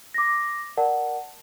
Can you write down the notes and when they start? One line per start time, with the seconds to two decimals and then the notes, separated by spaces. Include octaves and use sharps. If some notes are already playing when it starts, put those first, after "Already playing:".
0.14 D6 A#6
0.77 A#4 D5 F#5 A5